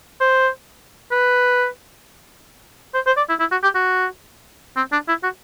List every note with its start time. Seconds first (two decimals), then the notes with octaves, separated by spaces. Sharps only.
0.20 C5
1.12 B4
2.94 C5
3.06 C5
3.17 D5
3.29 E4
3.39 E4
3.51 F#4
3.63 G4
3.75 F#4
4.77 C4
4.92 D4
5.08 E4
5.23 F#4